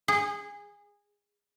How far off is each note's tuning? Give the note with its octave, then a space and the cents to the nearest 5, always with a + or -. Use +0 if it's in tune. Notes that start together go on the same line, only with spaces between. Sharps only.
G#4 -20